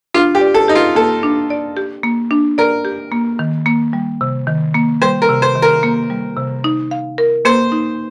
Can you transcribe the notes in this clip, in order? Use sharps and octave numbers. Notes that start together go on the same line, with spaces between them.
D4 F4
G4
D5
A4
D#4 G4
F4
A#3 A4
D4
D5
G4
A#3
D4
A#4 D5
G4
A#3
D#3
A#3
G3
C3
D#3
A#3
G3 C5
A#4
C3
C5
D#3
A#4
A#3
G3
C3
D#4
F5
A#4
A#3 C5
D#4